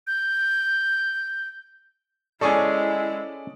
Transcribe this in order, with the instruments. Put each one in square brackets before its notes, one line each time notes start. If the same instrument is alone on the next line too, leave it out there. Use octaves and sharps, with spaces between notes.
[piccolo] G6
[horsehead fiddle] G#3 E4 [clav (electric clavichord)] C#4 G#4 A4 [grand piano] D5 C#6 D#6